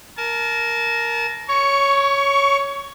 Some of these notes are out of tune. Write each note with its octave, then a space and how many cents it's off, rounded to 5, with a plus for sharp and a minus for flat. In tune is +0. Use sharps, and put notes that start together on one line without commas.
A#4 +0 A5 -30
C#5 +5 C#6 +25